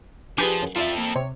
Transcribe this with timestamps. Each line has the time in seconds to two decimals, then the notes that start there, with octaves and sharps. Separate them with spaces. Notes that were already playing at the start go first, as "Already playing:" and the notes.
0.38 F3 D4 G4 G#4 B4 G#5
0.63 F#2
0.76 C4 F4 A4 D5 E5
0.98 A#3
1.16 C3 C#5